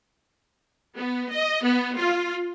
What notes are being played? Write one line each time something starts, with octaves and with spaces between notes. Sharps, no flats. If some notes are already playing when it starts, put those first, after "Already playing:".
B3
D#5
B3
F4